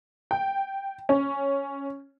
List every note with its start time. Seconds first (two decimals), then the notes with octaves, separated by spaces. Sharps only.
0.31 G5
1.09 C#4